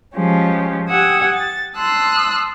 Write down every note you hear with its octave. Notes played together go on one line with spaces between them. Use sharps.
F3 G#3 C#4 G4
G4 F#5 G#5 D#6 E6
A6
A5 C6 D#6 E6 F#6